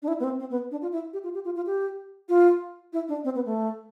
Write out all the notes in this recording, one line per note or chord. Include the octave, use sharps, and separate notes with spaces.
D4
E4
B3
C4
C4
B3
D4
F4
E4
G4
F4
G4
F4
F4
G4
F4
E4
D4
C4
B3
A3